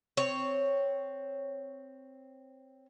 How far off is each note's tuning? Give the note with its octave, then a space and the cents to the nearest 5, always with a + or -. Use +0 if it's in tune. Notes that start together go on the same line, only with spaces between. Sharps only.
C4 +0 C#5 +0